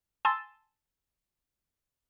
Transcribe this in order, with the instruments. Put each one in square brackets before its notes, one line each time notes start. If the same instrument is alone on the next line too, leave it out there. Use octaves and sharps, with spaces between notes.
[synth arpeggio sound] G#5 A5 C6 E6 A6